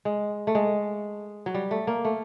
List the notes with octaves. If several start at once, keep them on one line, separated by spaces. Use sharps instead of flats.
G#3
A3
G#3
F#3
G3
A3
A#3
A3